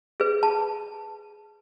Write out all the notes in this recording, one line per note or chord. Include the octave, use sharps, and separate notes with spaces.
G#4 B4
A5